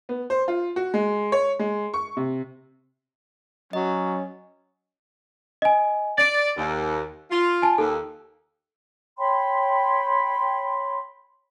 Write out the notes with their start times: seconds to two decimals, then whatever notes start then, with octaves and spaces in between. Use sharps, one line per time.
0.09 B3
0.30 C5
0.48 F4
0.76 F#4
0.94 G#3
1.32 C#5
1.59 G#3
1.94 C#6
2.17 C3
3.73 F#3 C#4 D#5
5.62 D#5 G#5
6.18 D5 A6 D7
6.57 D#2
7.31 F4
7.62 G#5 A5
7.78 D#2 A4
9.18 C#5 G5 B5 C6